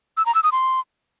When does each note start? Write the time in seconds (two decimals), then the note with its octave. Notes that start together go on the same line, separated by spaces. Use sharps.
0.17 E6
0.26 A#5
0.35 E6
0.43 D#6
0.52 C6